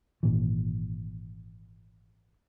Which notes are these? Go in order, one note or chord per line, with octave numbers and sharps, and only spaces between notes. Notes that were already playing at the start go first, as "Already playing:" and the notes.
G#1 A#2 E3